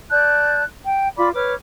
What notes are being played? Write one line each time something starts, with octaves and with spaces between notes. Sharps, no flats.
D5 A5 F#6 G6
G5
F4 D5 B5 D6
B4 C#5 D6 F6